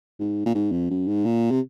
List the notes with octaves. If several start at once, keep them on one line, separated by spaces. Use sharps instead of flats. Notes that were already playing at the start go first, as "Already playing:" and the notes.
G#2
A#2
G#2
F2
F#2
G#2
A#2
C3